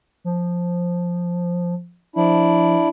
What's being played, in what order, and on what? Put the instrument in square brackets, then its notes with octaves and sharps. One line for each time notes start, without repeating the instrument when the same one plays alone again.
[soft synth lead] F3
[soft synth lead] F3 [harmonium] D4 E4